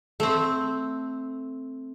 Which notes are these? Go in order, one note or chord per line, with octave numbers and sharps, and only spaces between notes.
A3 C4